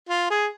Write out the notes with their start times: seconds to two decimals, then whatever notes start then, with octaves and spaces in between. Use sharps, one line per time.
0.09 F4
0.30 G#4